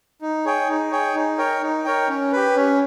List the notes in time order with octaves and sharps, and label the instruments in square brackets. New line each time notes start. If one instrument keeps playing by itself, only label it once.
[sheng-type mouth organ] D#4
G#4 C#5 G5
D#4
G#4 C#5 G5
D#4
A#4 C#5 G5
D#4
A#4 C#5 G5
C#4
G4 B4
C#4